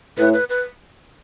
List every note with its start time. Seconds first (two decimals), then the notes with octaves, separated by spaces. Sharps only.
0.17 A2 B4
0.33 B4
0.49 B4